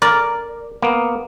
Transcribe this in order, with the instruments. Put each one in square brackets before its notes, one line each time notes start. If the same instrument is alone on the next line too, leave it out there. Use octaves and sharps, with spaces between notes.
[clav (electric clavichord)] A#4 [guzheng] D5
[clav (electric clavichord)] A#3 B3